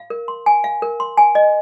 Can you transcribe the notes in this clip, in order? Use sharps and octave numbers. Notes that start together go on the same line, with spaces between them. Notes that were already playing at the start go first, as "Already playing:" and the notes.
Already playing: F5
A#4
C6
G#5
F5
A#4
C6
G#5
D#5